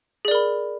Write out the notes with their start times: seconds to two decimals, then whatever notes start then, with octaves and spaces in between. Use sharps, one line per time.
0.25 G#4
0.28 D5
0.31 A#4
0.35 B5